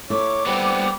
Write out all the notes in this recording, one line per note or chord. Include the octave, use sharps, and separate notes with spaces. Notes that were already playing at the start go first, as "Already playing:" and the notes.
A3 E4 C#5 D6
G3 B3 C4